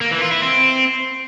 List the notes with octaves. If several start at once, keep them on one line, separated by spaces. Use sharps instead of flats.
A#3
E3
F4
E4
C4